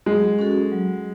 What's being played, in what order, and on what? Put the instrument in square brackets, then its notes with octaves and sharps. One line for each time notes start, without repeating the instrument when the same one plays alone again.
[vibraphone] F#3 [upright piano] G#3
[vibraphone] C#4 F#4 A4
F#3